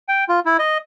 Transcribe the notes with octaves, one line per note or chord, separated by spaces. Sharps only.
G5
F4
E4
D#5